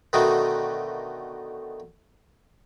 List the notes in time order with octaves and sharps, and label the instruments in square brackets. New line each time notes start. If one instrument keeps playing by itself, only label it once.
[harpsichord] B2 D3 D#3 A3 D#4 F#4